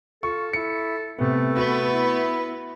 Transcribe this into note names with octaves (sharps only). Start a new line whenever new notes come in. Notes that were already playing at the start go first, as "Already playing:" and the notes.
F4 A4 C#6
E4 C#7
C3 A3 B3 A4
B3 F#4 B4
E4